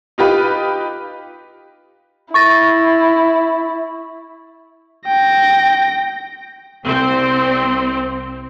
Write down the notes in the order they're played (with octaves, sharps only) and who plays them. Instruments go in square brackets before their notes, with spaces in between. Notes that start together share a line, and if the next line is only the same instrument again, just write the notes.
[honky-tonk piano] D#4 F4 G4 B4
[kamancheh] E4 [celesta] C#6 A6 A#6
[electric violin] G5 A#6
[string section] C2 C4